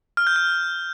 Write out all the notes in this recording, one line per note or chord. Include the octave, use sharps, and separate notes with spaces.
F6
G6
F6